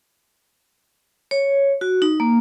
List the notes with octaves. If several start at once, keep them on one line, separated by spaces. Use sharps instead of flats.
C#5
F#4
D#4
A#3